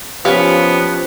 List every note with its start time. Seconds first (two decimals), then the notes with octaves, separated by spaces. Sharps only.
0.25 F3 B3 C#4 G4 C#5 F5 G#5